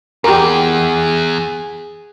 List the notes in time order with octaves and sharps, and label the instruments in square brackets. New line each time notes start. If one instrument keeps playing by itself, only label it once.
[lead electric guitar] E2 [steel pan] G4 A#4 [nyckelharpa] G#4